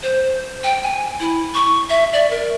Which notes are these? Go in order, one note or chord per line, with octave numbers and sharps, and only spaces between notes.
C5
G5
G#5
E4
C#6
E5
D5
A#4